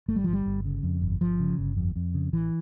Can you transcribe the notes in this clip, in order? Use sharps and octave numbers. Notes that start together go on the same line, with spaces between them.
G1 A3
G3
G1 F3
G3
G1
C#3
F2
G1
G1 F3
C#3
G1
F2
F2
C#3
A1 E3